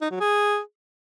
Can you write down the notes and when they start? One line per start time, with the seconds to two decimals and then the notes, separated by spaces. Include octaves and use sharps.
0.02 D#4
0.11 F#3
0.20 G#4